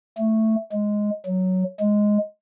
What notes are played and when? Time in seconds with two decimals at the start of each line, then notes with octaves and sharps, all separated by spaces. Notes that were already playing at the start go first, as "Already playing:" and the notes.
0.18 A3
0.72 G#3
1.26 F#3
1.80 G#3